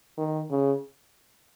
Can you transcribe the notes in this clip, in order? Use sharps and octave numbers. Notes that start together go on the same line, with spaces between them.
D#3
C#3